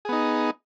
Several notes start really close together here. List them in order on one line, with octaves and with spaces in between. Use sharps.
G#4 B3 D#4